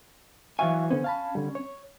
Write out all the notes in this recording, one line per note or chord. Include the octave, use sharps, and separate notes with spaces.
E3 F#3 E5 F5 G#5 C#6
D3 B3 C#4 C5
F5 A5 B5
D3 G3
C#5